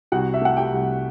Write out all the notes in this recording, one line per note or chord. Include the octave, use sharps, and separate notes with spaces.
C2 F#4 F#5
E5
A3 F#5
G4 G5
C2